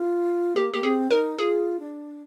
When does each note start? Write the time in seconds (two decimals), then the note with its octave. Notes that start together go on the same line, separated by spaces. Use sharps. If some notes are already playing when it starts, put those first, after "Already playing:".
Already playing: F4
0.56 A#3 G4
0.74 A#3 G4
0.83 C4 G#4
1.11 D#4 A#4
1.38 F4 G#4
1.79 D4